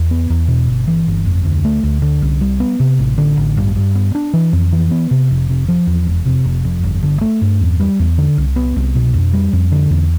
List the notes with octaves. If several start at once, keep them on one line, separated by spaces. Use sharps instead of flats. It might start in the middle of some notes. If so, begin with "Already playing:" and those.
Already playing: E2
B3
E2
B2
G1
E3
G1
F2
D2
A3
D2
D3
C2
G3
B3
C3
A1
D3
A1
G2
G2
B3
D4
E3
F2
E3
B3
C3
F1
C3
F3
E2
F1
C3
F1
F2
G1
D3
A3
G2
E2
G3
E2
D3
C2
B3
C2
B2
F2
G3
F2
D3
E2